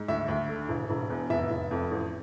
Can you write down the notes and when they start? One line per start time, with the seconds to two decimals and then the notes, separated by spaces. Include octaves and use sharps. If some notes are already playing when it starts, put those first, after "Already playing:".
Already playing: G#2
0.08 D2 E5
0.28 D2
0.49 D3
0.69 E1
0.90 E1
1.10 E2
1.30 F1 E5
1.51 F1
1.71 F2
1.91 A1